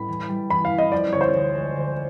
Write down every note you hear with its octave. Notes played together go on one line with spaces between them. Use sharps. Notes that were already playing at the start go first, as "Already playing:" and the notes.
Already playing: A2 G3 B3 B5
E3
G3
E3 B5
F5
E3
D#5
F3 D5
D2 C#5
C5
C#5
D2
G#3
D2